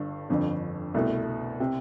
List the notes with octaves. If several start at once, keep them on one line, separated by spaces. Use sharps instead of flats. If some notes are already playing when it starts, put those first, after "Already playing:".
Already playing: G1 G2 D3
G1 F2 D3
C2 B2 A3
C3